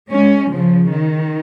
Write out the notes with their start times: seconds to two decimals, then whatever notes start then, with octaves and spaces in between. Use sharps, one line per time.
0.11 G#3 C#4
0.51 C#3 F3
0.92 D#3